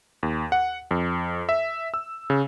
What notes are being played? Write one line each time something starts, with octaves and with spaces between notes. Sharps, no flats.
D#2
F#5
F2
E5
E6
C#3